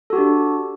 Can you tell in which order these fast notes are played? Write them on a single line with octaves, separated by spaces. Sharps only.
A4 F#4 G4 D4